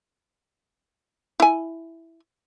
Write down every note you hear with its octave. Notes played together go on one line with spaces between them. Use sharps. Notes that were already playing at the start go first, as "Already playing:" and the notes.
E4 G#5